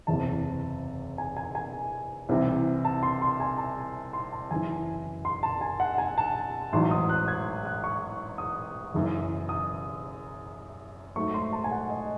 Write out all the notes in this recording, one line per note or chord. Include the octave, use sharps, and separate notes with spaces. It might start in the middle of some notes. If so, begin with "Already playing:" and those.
F#1 E2 C3 A5
G#5
G#5
G#5
C2 C3 E3
A5
C6
C6
G#5
A5
C6
A5
F#1 F#2 E3 G#5
C6
A5
G#5
F#5
G#5
A5
A1 G#2 F#3 C6
D#6
F#6
G#6
F#6
C#6
D#6
F#1 F#2 E3
D#6
G#2 F#3 A3 C#6
C6
A5
G#5
F#5
D#5